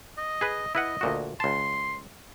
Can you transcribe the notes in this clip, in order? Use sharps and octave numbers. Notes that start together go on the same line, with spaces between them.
D#5
G#4 B4
E4 B4 D#5 F#5
D2 A#2 F#4
C#2 A5 C6